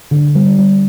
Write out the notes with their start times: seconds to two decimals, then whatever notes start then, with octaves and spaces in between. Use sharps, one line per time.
0.11 D3
0.35 G3
0.59 G3